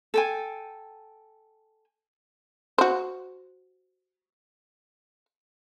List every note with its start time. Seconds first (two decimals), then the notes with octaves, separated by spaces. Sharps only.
0.14 A4 G5 G#5
2.78 F#4 C5